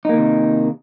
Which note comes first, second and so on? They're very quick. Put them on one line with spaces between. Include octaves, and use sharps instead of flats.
D#4 A#3 D#3 C3